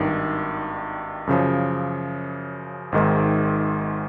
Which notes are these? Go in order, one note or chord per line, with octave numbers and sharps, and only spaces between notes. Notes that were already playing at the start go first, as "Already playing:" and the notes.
Already playing: G#1 G2 D#3
F#2 C#3 F3
G#1 G#2 D#3 G#3